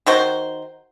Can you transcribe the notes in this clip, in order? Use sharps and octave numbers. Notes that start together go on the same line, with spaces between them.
D#3 F#4 C5